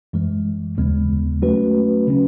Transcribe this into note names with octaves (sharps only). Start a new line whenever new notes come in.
F#2 E3 G#3
D#2 C#3 G#3 B3
F#3 A3 C#4 F#4 B4
C#3 F#3 C#4